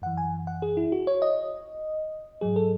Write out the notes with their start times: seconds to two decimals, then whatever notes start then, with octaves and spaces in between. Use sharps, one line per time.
0.02 F#2 E3 F#5
0.17 G#5
0.47 F#5
0.62 G#4
0.77 E4
0.92 F#4
1.07 C#5
1.22 D#5
2.41 G#2 F#3 G#4
2.56 A4